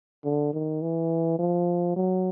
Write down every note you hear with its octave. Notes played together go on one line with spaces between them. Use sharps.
D3
D#3
E3
F3
F#3